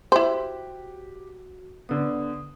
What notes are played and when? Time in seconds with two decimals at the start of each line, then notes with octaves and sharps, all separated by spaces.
0.12 E4 F#4 G4 C5
1.89 D3 B3 D#6